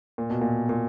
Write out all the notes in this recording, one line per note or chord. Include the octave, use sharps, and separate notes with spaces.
A#2
B2
A#2
A#2